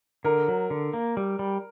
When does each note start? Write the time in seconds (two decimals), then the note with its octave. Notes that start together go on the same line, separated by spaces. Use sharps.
0.25 D3 A#4
0.48 F#3
0.70 D3
0.94 A#3
1.17 G3
1.39 G3